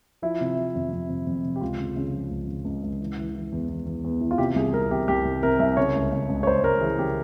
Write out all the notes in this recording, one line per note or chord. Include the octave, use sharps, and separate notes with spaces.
F3 E4
C3
F3
F2
F2
C3
F2
C3
G4
C#2 F4
C#3
C#3
F3
C#2
C#3
C#2
C#2
E3
E3
E3
E2
E2
E2
E2
E3
F4
C3 G4
C2 G#4
C2 A#4
C3 G4
C2 G4
C2
C3 A#4
C2 E5
C#3 C#5
C#2
C#3
C#2
C#5
C#2 C5
C#2 A#4
E3 G#4
C#3 G4